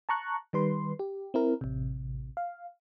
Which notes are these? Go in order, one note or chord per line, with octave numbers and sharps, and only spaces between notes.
A5 A#5 C#6 F#6
D#3 G3 B4 C6
G4
C4 E4 A#4
A1 C3
F5